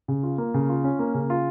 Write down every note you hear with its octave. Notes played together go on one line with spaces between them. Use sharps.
C#3
F4
A#3
C#3
F4
C#4
A#3
C#3
F4